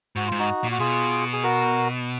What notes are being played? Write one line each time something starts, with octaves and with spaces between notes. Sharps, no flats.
G#2 F#4
G#2 F4
D#4 F#4
A#2
F#4
B2 F4 G#4
G#4
F#4 A#4